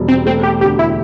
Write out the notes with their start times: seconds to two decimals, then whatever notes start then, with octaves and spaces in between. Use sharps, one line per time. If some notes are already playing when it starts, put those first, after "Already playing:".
Already playing: E1 G3
0.08 C4
0.26 A3 C4
0.43 G4
0.61 D2 G4
0.79 E4